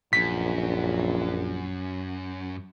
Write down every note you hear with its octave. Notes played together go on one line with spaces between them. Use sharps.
A#1 F#2 B6